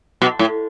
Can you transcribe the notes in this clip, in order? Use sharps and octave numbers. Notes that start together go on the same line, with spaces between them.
B2
A2